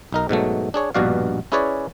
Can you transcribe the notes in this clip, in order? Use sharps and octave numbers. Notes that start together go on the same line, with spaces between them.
B1 D#4 A#4
G#2 B2 F#3 A3
D4 G#4 C#5
A#1 G2 B2 F#4 D5 F5
C#4 E4 G#4 B4 C#5 D5